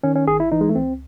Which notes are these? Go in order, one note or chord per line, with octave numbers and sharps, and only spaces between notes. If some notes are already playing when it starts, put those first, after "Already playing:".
D#3 C#4
C#4
G#1 G#4
E4
E3 D#4
G#3
A3
C#2 C4